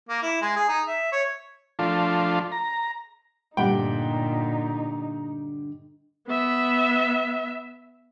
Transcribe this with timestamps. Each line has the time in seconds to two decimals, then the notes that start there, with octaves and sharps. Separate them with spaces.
0.09 A#3
0.23 E4
0.42 G#3
0.56 G#4
0.69 D#4
0.88 E5
1.12 C#5
1.79 F3 A3 D4 F4
2.52 A#5
3.57 G2 A#2 D3 A3 D#4 G4 F#5 G5
6.28 B3 E5